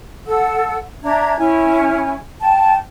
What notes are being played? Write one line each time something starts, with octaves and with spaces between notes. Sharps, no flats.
A4 F#5 E6
D4 E5 A#5 G#6
C#4 E4 G#5
G5 A5